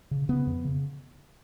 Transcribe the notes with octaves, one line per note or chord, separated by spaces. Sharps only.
C#3
C#3 B3
F2
C#3